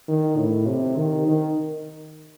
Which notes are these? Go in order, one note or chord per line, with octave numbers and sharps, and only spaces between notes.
D#3
A2
C3
D#3
D#3